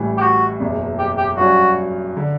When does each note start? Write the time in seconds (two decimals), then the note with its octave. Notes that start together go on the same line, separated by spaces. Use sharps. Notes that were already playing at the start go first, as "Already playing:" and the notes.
Already playing: A1 A2 E3 G3
0.17 G4
0.21 F#4
0.60 F#1 E2 B2
0.98 G4
1.17 G4
1.36 G2 F#3 C#4 F#4
2.17 D3